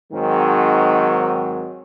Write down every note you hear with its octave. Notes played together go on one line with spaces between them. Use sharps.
G#2 D#3 F#3 G#3 C4